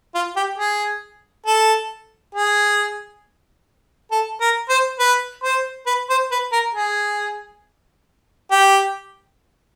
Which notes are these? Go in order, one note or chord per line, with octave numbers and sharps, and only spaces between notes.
F4
G4
G#4
A4
G#4
A4
A#4
C5
B4
C5
B4
C5
B4
A#4
G#4
G4